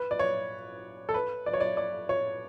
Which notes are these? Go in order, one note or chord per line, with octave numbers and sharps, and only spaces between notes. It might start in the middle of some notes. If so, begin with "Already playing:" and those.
Already playing: B4
D5
C#5
A4
B4
D5
C#5
D5
D5
C#5